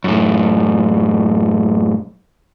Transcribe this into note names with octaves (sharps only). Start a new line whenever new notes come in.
F#2 A2